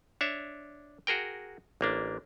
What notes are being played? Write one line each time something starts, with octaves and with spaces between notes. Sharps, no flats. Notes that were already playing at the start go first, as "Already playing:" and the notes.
D4 C#5 E5
F#4 G#4 A#4 G5
A1 A#3 D4